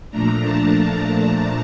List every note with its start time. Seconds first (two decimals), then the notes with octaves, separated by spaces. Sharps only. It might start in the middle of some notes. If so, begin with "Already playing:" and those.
0.10 A#2 F3 A3 D4 A#5
0.43 A5